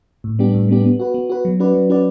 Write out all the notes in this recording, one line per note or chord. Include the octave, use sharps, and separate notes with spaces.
A2
G3 B3 D4 G4
A2
G3 B3 D4 G4
B3
F#4 B4
B3
F#4 B4
F#3
C#4 F#4 B4 D5
F#3
C#4 F#4 B4 D5